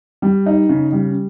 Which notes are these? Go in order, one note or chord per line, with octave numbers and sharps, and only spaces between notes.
G3
D#4
C#3
G3